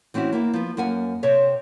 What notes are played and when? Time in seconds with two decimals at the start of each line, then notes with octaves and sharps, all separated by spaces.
0.14 E3 C4 C#4 E4 F#4
0.33 A#3 B3 E4
0.54 F3 B3
0.77 F#2 A#3 F#5 G#5
1.23 C3 C4 C#5 E5